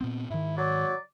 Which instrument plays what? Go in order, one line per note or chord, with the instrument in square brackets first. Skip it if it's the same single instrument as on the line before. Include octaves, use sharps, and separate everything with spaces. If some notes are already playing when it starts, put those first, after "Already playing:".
[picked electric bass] A#2 B3 C4
[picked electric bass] G#2 D#3 [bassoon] E4
[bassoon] F#3 [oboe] D5